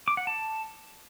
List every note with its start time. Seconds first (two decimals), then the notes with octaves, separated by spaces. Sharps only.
0.08 D6
0.17 F#5
0.27 A5